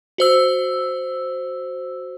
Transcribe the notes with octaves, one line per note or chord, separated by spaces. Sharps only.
F#4 C5 E6